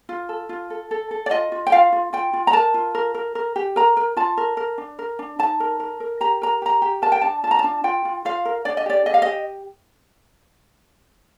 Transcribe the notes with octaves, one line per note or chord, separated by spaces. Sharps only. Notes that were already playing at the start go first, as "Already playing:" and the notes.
F4
A4
F4
A4
A4
A4
D5
F4 D#5
F4
G5
F4 F5
F4
F4 G5
F4
A#5
A#4 A5
F4
A#4
A#4
A#4
G4
A#4 A#5
A#4
F4 A5
A#4
A#4
D4
A#4
D4
D#4 A5
A#4
A#4
A#4
G4 A#5
A#4 A#5
G4 A#5
G4
A#4 A5
G5
D4 A5
F4 A5
A#5
D4 A5
F4 G5
F4
F4 F5
A#4
D4 D5
D#5
G4 D5
G4 D#5
F5
G4 D#5